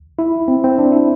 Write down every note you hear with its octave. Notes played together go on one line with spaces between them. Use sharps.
E4
C4
C4
D4
E4